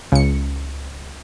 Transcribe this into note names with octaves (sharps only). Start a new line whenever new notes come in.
C#2 C#7